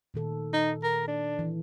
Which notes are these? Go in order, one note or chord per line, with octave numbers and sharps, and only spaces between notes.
A#2 D#3 A4
D#4
A#4
D4
E3